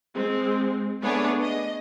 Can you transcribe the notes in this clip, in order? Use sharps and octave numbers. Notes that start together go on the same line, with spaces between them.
G#3 C4
A3 B3 D4 G#4 C#5 D5
D#5